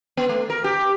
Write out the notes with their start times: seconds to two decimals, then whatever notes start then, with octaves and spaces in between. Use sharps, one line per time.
0.17 B3
0.29 A3
0.50 A#4
0.64 G4